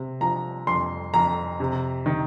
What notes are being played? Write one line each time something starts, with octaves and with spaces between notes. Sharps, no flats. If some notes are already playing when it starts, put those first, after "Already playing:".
Already playing: C3
F3 A#5
F2 C6
F2 A#5
C3
D#3